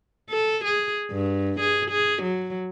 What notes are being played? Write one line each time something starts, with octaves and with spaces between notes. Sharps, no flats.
A4
G#4
G2
G#4
G#4
F#3